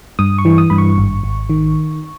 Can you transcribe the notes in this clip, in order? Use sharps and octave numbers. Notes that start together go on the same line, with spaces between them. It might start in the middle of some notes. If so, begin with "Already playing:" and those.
G2 D#6
C#6
E3
D#6
G2 B5
C#6
G#1
G#1
D#3